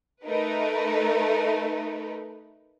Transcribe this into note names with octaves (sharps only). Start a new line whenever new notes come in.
A3 D#4 A#4 B4